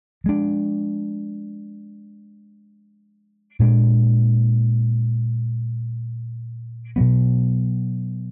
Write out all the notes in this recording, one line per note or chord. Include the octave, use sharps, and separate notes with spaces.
F3 G#3 D4
A#2 G#3 B3 D4
B2 F#3 B3